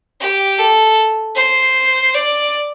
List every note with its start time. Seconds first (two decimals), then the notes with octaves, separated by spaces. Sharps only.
0.21 G4
0.59 A4
1.36 C5
2.14 D5